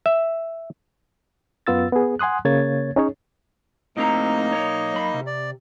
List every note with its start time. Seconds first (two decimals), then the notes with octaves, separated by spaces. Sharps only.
0.06 E5
1.67 F#2 B3 F4 E6 A6
1.92 B3 G#4
2.19 F#5 G#5 C6 D#6 F#6
2.45 C#3 A#3 C#5 G#6 A6
2.96 C#4 D#4 G#4 C#5
3.97 A2 A#3 C4 D#4 D#5 A#5
4.52 B1 C#5
4.94 F#2 B5
5.14 C3
5.27 D5